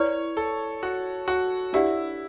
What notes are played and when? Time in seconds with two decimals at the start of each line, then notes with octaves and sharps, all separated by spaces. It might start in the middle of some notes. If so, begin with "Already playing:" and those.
Already playing: E4 B4 C#5 D5
0.37 A4
0.83 F#4
1.28 F#4
1.73 D4 E4 G4 B4 D5 F#5